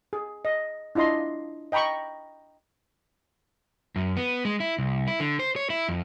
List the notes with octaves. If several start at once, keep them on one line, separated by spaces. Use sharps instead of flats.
G#4
D#5
D4 E4 F4 D#5 C6
D#5 G5 A#5 B5 C#6
F#2
B3
G#3
E4
C2
E4
D3
C5
C#5
E4
F2